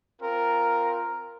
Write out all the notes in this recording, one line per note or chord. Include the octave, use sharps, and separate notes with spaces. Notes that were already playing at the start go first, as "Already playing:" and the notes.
C4 F4 A#4